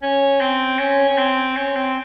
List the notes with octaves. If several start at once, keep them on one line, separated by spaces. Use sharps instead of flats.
C#4
C4
C#4
C#4
C4
C#4
C4